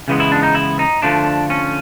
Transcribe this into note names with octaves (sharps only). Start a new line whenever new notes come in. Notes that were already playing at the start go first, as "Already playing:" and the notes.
C#3 E3 G#3 B3
E4
D4
D#4
E4
D#4
D3 F3 A3 D4
C#4